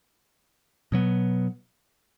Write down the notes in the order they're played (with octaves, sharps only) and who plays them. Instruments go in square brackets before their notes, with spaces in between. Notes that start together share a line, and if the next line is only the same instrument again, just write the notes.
[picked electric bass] B2 F#3 B3